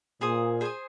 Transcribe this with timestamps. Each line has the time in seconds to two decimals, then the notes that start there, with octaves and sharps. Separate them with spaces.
0.21 A#2 G#4 C5 G#5 D#6
0.61 G#4 C5 G#5 D#6